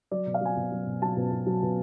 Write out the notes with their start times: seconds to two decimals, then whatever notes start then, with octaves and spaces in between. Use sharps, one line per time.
0.11 F#3 D5
0.26 B2
0.34 F5
0.41 F#3 G#5
0.57 B2
0.72 F#3
0.87 B2
1.02 F#3 A5
1.17 B2
1.32 B2
1.47 F#3
1.63 B2